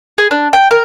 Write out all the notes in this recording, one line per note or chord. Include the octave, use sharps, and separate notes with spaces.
G#4
D4
G5
A#4